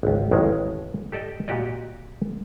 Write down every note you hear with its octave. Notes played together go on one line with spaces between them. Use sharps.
G#1 C#2
A1 F2 D#3 G#3
G4 A4 D5 D#5 G5
A#2 F#4 G4 D5 D#5